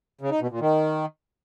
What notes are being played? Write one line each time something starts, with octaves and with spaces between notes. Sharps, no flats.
C#3
D#4
B2
A#2
D#3